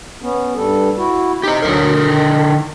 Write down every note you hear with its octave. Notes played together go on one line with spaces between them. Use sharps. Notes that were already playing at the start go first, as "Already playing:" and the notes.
B3 C#4
G2 G3 A4
E4 F#4
D#4 G4 C5
D2 D3 F#3 A#4
D#3